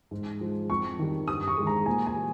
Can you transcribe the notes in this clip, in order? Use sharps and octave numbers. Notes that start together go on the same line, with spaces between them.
G#2
F3 G#3
F2 C#6
D#3 G3
G2 D#6
C#6
D#3 G#3
A#5
A#2 G#5
G#5
G3